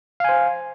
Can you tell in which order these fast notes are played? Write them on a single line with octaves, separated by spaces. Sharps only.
F5 G#5 C5